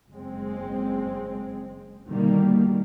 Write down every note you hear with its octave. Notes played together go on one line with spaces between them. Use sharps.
F#1 G#3 C4
B2 D3 D#3 G3 A#3